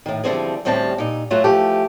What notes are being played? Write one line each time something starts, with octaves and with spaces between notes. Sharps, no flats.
A2 D#3
D3 E3 F3 G3 C4 G#4
D2 A2 G3 C4 C#4 A5
A#2 D#4
F#3 A3 F4 F#4
E3 F3 A3 G4